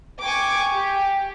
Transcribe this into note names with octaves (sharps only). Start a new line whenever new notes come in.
G5 G#5 C#6 D6
G4